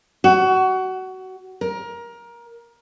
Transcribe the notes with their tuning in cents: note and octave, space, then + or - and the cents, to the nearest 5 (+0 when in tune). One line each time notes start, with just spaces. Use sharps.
F#4 +20
A#4 +20